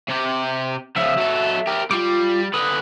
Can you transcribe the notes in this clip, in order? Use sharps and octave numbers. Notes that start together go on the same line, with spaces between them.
C3 G4
C#3 F3 E5
F#3 A4
G4 A#4
G3 F4 D6
D3 B4 D#6